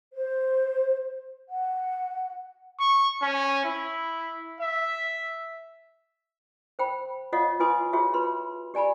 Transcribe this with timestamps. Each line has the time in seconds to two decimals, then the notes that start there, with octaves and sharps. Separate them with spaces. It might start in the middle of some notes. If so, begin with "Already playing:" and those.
0.13 C5
1.48 F#5
2.80 C#6
3.23 C#4
3.65 E4
4.61 E5
6.79 C5 G5 B5
7.33 F4 C#5 D#5 F5 F#5 D#6
7.60 E4 F4 B4 G#5 C6 D#6
7.93 F4 F#4 G#4 C#5 E5
8.14 B4 B5 C6
8.74 G4 D5 G#5 A#5 B5